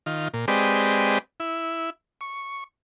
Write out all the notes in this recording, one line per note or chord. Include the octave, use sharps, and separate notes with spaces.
D#3 F4
A#2
G#3 C4 G4 B4 D5 D#5
E4
C#6